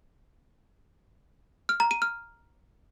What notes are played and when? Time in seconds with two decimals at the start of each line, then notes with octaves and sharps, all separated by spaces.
1.69 F6
1.80 A#5
1.91 D#7
2.02 F6